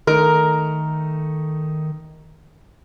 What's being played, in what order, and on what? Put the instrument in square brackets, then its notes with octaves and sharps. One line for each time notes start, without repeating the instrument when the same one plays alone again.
[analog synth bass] D#3 [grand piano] A3 D#4 [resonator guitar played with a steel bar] A#4